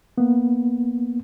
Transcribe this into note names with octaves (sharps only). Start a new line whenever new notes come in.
A#3 B3